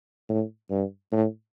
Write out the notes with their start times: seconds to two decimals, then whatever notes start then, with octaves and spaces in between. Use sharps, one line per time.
0.29 A2
0.71 G2
1.12 A2